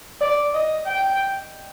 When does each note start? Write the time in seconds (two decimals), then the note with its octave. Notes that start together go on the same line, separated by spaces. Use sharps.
0.21 D5
0.54 D#5
0.87 G5